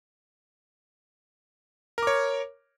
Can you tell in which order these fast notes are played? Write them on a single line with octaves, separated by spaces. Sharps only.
A#4 D6 C#5